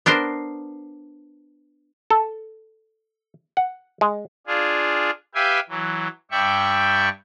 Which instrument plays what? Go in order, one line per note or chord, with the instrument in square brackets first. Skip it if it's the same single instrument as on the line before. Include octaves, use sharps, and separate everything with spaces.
[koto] B3 D4 A#4 C5
[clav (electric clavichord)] A4
F#5
G#3
[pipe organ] D4 F4 G#4
G4 B4 E5 F5 G5 G#5
E3 F#3
G2 D5 E5 G5 C#6